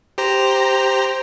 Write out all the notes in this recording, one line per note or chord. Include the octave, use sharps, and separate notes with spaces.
G4 C5 A#5